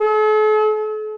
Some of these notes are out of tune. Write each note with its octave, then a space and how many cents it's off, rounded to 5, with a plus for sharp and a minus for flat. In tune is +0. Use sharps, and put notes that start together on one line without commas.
A4 -45